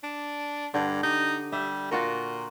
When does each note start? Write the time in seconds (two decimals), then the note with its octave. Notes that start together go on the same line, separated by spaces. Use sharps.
0.04 D4
0.74 G2 D3
1.03 D#4 G4
1.52 G3 E5
1.91 A#2 F4 F#4 A#4